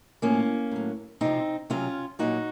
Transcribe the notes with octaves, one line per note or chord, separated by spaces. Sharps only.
A2 F3 A#3 C#4
A2 F#3
C3 F3 C4 D#4
C3 F#3 C#4 F4
A#2 F#3 D#4 F#4